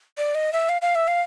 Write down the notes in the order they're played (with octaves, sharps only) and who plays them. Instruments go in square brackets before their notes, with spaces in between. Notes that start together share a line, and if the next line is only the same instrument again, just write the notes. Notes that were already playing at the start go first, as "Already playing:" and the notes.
[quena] D5
D#5
E5
F5
F5
E5
F5